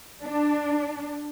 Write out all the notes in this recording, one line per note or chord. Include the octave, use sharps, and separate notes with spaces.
D4